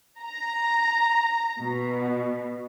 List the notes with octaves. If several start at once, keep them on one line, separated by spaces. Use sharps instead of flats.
A#5
B2